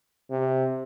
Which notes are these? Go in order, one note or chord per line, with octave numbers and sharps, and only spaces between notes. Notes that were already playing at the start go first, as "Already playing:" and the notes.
C3